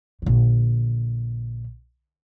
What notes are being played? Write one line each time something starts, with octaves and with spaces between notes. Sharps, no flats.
A#1 D3